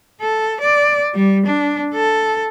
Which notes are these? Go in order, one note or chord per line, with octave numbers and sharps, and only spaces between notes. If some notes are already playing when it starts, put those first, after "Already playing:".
A4
D5
G3
D4
A4